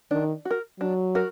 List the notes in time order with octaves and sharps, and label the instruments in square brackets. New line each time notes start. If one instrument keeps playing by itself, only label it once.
[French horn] D#3 [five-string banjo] D4
[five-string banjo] F#4
A#4
[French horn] F#3 [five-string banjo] D4
[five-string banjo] F#4 A#4